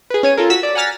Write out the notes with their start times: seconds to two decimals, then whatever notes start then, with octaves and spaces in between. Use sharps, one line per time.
0.10 G#4 B4
0.23 C#4 C#5 D#7
0.37 F4 A4 A#4
0.50 F#4 E6 B6
0.63 D5
0.75 F#5 G#5 A#5 F6 A6 B6